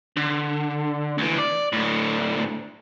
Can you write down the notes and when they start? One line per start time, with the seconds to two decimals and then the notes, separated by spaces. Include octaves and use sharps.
0.17 D3
1.18 D2 E3
1.38 D5
1.73 A2 D3